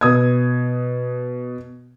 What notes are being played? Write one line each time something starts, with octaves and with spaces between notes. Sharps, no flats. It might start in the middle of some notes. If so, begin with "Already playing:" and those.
B2 D#6 G#6